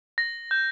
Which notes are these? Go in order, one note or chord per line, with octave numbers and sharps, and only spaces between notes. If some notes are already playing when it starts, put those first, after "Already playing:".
A#6
G6